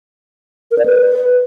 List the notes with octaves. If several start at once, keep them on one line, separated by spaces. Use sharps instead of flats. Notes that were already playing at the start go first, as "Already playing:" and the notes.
A#4
D5
B4